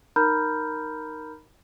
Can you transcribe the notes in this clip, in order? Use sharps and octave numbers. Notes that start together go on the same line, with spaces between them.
D#4 A#4 A#5 B5 F6 G6